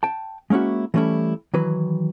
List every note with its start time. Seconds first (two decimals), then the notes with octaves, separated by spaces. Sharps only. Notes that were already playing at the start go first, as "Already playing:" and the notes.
0.03 G5 A5
0.50 G#3 A#3 C#4 E4 F#4
0.94 E3 G3 A3 C#4 E4
1.54 D#3 E3 F#3 B4